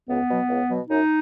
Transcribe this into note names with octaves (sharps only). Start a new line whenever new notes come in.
C#2 B3
B2 F#3
C#2
B2 F#3
F#2 D#4